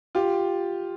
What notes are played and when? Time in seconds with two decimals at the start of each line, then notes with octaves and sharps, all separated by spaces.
0.15 F4 G4